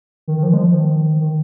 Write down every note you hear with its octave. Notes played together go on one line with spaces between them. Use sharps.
D#3
D#3
F3
G#3
F3
D#3
D#3